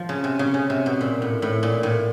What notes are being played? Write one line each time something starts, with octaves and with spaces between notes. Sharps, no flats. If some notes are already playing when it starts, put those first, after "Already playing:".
Already playing: F3
C#3
C3
C#3
C#3
C3
B2
A#2
A2
A2
A#2
A2